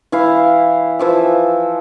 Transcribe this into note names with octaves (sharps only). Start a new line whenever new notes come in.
E3 E4 F5
E3 F3 E5